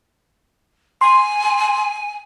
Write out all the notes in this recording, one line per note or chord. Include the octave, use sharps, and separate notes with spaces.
G#5 C6